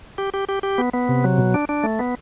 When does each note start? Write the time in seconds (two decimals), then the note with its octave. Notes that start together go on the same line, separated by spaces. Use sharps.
0.18 G4
0.34 G4
0.49 G4
0.63 G4
0.78 B3
0.93 B3
1.09 C3
1.24 F#3
1.38 B2
1.54 D4
1.69 D4
1.84 A3
1.99 B3